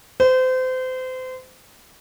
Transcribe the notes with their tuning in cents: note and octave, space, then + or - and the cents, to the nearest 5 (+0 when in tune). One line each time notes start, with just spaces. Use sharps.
C5 -30